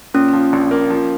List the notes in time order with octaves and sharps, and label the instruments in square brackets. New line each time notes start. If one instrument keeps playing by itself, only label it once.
[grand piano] A#2 [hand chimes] C#4
[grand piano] F3
A#1
A#3
F3